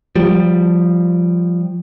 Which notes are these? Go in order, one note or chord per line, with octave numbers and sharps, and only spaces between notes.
F3 G3